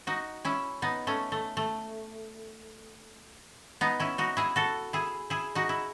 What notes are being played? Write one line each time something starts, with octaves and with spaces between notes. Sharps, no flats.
D#4 F#4
C#4 E4
B3 D#4
A3 C#4
A3
A3
B3 D#4
C#4 E4
D#4 F#4
E4 G#4
F#4 A4
E4 G#4
E4 G#4
D#4 F#4
E4